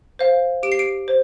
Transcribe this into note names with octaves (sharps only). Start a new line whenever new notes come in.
C5 F5
G4 D7
C7
D7
C5